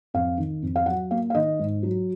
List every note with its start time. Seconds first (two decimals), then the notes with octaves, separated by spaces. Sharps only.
0.14 F2 F5
0.38 D#3
0.62 F2
0.76 F5
0.86 F#3 F#5
1.11 A#3 F5
1.30 F5
1.34 D#3 D#5
1.59 G#2
1.83 F#3